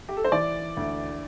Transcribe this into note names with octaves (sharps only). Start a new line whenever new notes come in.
G4
A4
C5
E3 D5
D2